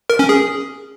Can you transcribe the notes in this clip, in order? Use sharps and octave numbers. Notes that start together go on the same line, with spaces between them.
A#4
C#4
G#4